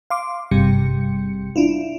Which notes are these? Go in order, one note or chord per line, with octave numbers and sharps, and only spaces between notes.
F5 C6 D6
G#1 G2 C3 G3 C#7
D4 E4 F4